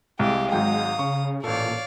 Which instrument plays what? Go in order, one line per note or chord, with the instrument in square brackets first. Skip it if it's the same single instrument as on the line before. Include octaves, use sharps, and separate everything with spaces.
[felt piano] C2 [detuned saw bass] G#3 [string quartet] G4 [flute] F5
[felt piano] G#1 F#3 G5 [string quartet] A#5 D#6
[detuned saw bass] C#3 [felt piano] C#6
[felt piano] A1 A4 [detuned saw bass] A#2 [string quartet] C#5 D5 F5